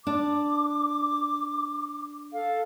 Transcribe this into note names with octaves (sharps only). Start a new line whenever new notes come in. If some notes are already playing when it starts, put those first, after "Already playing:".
D4 D6
A4 F5